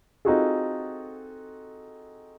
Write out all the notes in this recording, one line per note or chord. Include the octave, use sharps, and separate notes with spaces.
C4 D#4 F4 F#4 G#4 A4